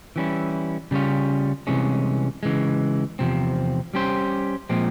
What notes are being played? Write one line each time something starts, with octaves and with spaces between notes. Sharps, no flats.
E3 G3 C#4 E4
C#3 G3 C#4 F4
C2 C3 E3 G#3 C#4
C#3 E3 G#3
E2 C3 F3 C4
G3 C#4 G4 C5
A#2 F3 G#3 C4